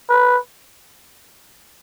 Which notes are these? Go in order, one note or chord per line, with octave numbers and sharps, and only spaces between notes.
B4